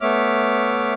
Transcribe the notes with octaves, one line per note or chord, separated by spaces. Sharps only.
A3 B3 C#5 E5 D6 F6